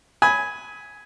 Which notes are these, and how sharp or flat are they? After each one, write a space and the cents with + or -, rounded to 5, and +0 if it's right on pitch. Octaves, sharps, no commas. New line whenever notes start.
G#5 +0 B5 +0 D#6 +40